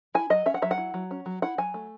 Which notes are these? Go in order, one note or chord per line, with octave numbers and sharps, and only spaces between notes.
E4 G#5
F#3 D#5
C#4 E5
F#5
F#3 E5
F#5
E4
F#3
C#4
F#3
E4 F#5
F#3 G#5
A3